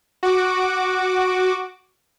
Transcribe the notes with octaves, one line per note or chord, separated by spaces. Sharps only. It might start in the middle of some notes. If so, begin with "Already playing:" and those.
F#4 D6